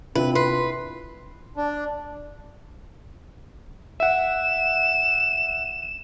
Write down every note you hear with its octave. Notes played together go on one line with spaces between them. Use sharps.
C3 C4 D4 E4 F4 B4
B4 C6
D4
E5 F#5 E7